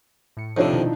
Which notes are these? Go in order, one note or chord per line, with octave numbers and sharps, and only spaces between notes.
A2 C#7
G1 F2 C3 F3 D4 D#4 C#5 E6
B2 D#3 E4